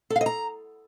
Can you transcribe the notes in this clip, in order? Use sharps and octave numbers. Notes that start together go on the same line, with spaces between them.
A4
F5
D#5
A#5